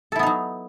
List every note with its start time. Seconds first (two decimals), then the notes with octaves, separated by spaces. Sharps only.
0.12 A4
0.16 E4
0.19 B3
0.23 D#4
0.27 F#3